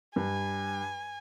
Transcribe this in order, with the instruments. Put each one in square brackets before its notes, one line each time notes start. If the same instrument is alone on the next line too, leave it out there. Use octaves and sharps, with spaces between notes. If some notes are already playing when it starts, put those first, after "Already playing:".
[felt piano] G2 [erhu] G#5